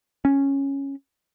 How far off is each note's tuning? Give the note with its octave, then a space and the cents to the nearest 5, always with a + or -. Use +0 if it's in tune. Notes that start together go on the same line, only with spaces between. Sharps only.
C#4 -5